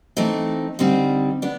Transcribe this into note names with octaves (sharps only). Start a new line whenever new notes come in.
E3 A3 C4 D#4
D3 G3 C4 D#4
B3 D4